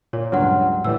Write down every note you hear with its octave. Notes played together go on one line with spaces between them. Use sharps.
A#2 C#5
C#2 G2 F#3 F#5 C6 F6
A2 E3 G3 E6